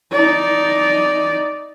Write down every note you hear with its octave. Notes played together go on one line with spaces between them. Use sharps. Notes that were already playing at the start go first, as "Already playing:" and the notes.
D#4 D5